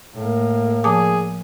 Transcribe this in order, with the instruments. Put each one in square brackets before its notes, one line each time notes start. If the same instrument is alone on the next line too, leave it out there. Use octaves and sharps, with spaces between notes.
[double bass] A2 A#3
[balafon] F3 A5 D6 [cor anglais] G#4